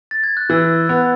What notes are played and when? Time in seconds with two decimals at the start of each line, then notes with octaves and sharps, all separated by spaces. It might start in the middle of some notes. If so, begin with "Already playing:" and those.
0.11 A6
0.24 G#6
0.37 F#6
0.50 E3 E6
0.89 B3